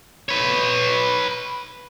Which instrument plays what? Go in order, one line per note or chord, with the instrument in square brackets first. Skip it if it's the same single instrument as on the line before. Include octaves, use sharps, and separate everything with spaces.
[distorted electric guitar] B4 C#5